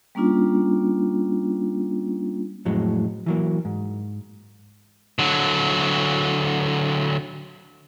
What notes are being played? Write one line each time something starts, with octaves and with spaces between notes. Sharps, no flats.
G3 A#3 C#4 D4 F4
F2 A2 F#3 G#3
E3 F#3 A#3
G#2
D3 F#3